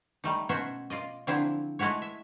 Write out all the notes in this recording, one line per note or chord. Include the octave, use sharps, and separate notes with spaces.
G3 A3 D#4
B2 C#4 F#4 C5 E5
F4 D5 D#5
D3 F3 F#3 C4 D4 E4
G#3 A3 E4 F#4 C#5
E5